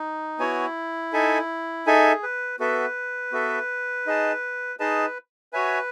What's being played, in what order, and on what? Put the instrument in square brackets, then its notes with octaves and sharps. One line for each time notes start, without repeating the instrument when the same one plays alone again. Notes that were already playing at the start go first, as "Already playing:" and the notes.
Already playing: [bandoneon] D#4
[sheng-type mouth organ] B3 F#4 C#5 G#5 [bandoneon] E4
[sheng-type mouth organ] D#4 A4 E5 G#5
[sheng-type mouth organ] D#4 A4 E5 G#5 [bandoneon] G#4
[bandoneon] B4
[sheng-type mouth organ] B3 F#4 A4 E5 [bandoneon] B4
[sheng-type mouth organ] B3 F#4 A4 E5
D#4 G#4 D#5 A5
[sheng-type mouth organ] D#4 G#4 D#5 A5 [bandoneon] B4
[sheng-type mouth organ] F#4 C#5 E5 G#5 [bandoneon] B4